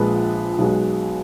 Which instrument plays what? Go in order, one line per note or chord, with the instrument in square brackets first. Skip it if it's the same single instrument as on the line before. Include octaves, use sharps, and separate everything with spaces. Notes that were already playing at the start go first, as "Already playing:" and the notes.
Already playing: [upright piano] A#1 A#2 F3 G#3 B4
B1 B2 G#3